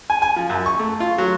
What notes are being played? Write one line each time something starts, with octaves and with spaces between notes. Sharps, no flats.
G#5
G#5
F3
F#2
C#6
A3
F4
F#3